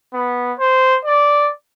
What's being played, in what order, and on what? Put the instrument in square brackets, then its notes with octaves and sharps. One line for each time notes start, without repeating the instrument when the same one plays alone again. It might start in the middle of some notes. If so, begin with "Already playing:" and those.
[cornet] B3
C5
D5